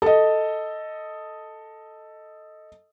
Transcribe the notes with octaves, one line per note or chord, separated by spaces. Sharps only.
A4 D#5